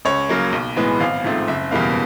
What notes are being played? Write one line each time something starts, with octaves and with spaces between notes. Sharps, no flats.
C#2 C#5
C#3 F#3 A#3
B1
A2 E3 G#3 B3
G#1 F5
G#2 F3 A3 C4
F#1 E5
E2 B2 G3 A#3 F5